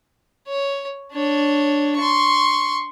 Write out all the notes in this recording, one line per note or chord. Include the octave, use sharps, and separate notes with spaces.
C#5
D4 C#5
C6 C#6